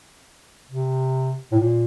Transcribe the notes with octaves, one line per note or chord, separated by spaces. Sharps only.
C3
A2
A#2